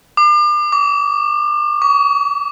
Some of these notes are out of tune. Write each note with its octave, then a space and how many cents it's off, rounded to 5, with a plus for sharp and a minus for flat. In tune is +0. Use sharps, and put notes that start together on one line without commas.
D6 +40
D6 -35
C#6 +35